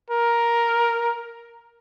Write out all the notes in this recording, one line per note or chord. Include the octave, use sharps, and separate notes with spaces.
A#4